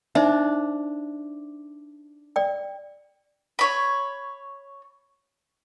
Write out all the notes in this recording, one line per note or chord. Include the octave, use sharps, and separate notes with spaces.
D4 D#4 C5 E5
D5 G5
C#5 B5